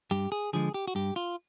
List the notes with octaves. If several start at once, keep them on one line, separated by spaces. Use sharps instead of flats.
G2 G4
G#4
D3 F3 G#3 G#4
G4
F#4
G2 G4
F4